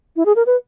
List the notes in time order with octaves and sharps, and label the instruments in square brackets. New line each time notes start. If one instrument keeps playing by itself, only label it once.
[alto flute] E4
G#4
A#4
B4